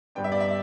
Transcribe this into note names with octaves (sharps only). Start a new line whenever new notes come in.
G2 G3 B3 D4 G5
E5
D5
E5